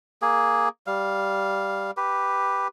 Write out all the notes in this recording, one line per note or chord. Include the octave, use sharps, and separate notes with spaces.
A#3 G#4
G3 F5
G4 B4